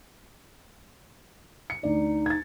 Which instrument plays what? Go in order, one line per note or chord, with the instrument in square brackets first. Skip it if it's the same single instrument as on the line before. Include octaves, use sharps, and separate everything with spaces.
[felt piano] C#7
[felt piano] D2 D5 [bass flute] D#4
[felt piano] G#6 A6